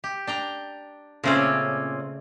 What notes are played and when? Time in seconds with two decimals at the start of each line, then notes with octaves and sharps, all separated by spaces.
0.04 G4
0.27 D4 G5 A#5
1.24 A#2 C#3 A3 C4 C#4 D5